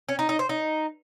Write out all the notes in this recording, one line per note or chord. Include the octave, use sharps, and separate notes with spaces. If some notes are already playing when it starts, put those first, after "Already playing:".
C#4
D#4
D#4
C5
D#4